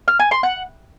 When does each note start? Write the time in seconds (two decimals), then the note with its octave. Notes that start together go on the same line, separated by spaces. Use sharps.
0.08 F6
0.19 G#5
0.31 C6
0.43 F#5